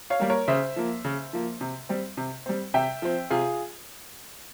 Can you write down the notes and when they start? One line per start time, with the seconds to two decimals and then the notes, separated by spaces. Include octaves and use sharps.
0.10 C#5 F5
0.20 G3 A#3
0.30 A#4 C#5
0.48 C#3 C5 E5
0.76 F3 A#3
1.05 C#3
1.33 F3 A#3
1.61 C3
1.89 G3 C4
2.17 C3
2.46 G3 C4
2.74 C3 E5 G5
3.02 F3 C4
3.30 C3 F4 G#4